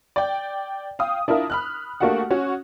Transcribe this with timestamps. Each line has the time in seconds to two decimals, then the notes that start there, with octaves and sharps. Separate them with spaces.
0.16 D5 G5
0.99 F5 G5 D#6
1.28 D4 E4 F4 A#4
1.50 B5 F6 F#6
2.00 A3 A#3 D4 F#4 G4 F#5
2.30 C#4 F#4